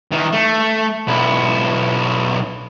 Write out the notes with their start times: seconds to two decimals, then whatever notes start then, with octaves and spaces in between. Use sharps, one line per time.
0.11 D#3 E3
0.33 A3
1.08 B1 E4